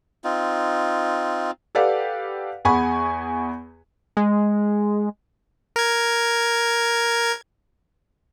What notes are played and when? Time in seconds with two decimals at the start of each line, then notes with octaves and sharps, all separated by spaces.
0.24 C4 D#4 F4
1.75 G4 A4 B4 D5 F5 F#5
2.65 E2 G#4 F#5 G#5 B5 C#6
4.17 G#3
5.76 A#4 G#6